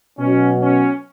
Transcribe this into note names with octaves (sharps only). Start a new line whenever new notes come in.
B2 F#3 C#4
C#4